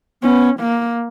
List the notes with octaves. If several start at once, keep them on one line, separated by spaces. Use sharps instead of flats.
B3 C#4
A#3